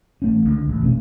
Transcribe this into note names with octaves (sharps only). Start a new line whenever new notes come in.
A1 A3 C#4
C#2 D3
A1
F1 B2 A3 C#4